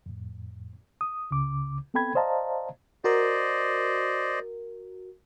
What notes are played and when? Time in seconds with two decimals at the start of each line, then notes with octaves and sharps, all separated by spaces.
0.06 F2 A2
1.01 D#6
1.31 C#2 C#3 D6
1.94 B3 C4 A4 G5 B5 G#6
2.15 C5 D5 D#5 F5 A5 A#5
3.04 F#4 A#4 C5 D5 D#5